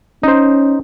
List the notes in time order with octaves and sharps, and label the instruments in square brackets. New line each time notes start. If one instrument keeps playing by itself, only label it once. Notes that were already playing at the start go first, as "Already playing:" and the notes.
[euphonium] C#4 [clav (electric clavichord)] D#4 C5